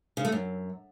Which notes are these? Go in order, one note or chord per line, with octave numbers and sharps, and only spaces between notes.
C#3
A3
F#2